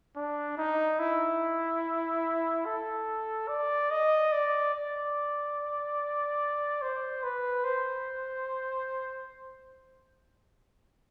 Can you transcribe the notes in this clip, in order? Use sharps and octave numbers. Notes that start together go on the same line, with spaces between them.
D4
D#4
E4
A4
D5
D#5
D5
D5
C5
B4
C5